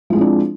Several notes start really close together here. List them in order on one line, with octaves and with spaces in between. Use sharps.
F3 G#3 E4 C4 D4